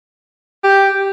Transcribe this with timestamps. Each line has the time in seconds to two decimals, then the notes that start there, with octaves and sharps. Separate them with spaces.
0.64 G4